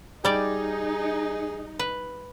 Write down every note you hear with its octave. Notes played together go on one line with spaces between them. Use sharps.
G3 D#4 G#4 D5
B4